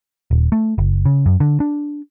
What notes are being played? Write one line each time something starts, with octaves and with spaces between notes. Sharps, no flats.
D#1
A3
F#1
C#3
F#2
D3
D4